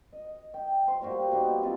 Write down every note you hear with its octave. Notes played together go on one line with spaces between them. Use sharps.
D#5
G5
C5
G3 A#3 F#4 G4
A#3 B3 D#4
C4 F4 A4